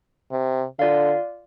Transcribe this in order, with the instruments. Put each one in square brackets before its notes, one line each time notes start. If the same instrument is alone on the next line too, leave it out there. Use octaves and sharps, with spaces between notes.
[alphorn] C3
[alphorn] D3 [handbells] F4 D5 F5